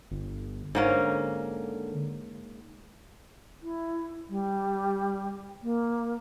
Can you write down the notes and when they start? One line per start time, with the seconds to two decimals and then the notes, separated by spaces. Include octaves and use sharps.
0.11 G1
0.75 G#2 D3 A#3 C#4
3.63 E4
4.29 G3
5.63 A#3